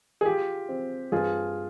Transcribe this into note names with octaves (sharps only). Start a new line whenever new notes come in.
G#4
F4 G4
C4
G2 F4 G#4